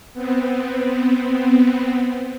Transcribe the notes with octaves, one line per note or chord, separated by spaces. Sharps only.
B3 C4